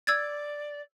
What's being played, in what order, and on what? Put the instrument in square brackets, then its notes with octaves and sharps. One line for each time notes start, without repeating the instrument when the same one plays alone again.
[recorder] D5 [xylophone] E6 G#6 A6